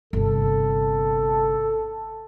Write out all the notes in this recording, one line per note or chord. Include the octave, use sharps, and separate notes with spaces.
G1 C3 A4